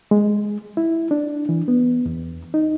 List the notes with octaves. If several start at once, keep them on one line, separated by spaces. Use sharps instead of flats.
G#3
E4
D4
E3
B3
E2
D#4